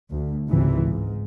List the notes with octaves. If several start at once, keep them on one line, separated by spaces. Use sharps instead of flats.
D2
G#1 C#2 C3 E3
G#2